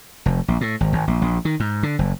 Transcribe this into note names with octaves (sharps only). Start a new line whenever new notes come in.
F1
A#1
A2
G#1
G#1
A#1
A#1
D#3
G#2
D3
F#1